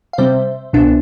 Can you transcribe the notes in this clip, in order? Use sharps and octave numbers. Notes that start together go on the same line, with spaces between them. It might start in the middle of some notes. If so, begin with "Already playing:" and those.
F5
C3 G3 C4 C5 E5
C2 B2 B3 D4